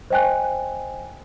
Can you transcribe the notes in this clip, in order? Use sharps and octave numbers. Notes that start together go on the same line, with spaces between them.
C5 D#5 G5 G#5 F#6